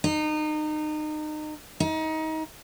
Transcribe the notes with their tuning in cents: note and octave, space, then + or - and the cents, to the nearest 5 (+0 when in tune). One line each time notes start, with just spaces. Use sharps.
D#4 -30
D#4 +25